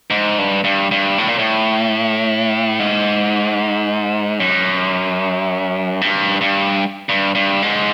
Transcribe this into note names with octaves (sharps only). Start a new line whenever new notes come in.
G#2
G2
G2
G2
A2
A#2
A2
G#2
F#2
G2
G2
G2
G2
G#2